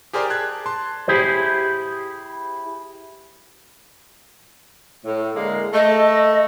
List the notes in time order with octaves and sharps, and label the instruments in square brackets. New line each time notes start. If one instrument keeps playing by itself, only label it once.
[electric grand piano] G4 G#4 A#4 C5 D5
A5 F#6 G#6
A5 C6
[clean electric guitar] E4 G4 G#4 C5
[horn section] A2
D3 G#3 A#3
[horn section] A3 [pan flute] D#5